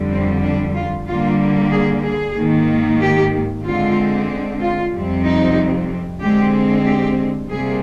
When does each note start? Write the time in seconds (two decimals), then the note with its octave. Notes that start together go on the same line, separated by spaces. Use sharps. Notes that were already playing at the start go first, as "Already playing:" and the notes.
Already playing: F2 D3 G3
0.12 C4
0.43 D4
0.75 F4
1.08 D3 G3 A#3 F4
1.72 G#4
2.04 G#4
2.36 G#2 D#3 A#3
3.00 G4
3.64 D3 G#3 C4 F4
4.61 F4
4.93 F2 C3 G3 C4
5.25 D#4
6.21 D3 G#3 C4 G4
6.85 G4
7.49 C3 G3 A#3 G#4